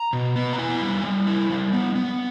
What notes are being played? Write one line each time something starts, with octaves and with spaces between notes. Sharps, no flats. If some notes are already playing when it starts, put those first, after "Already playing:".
Already playing: A#5
B2
B3
A#5
E4 G#5
G3
G3
E4
G3
B3
B3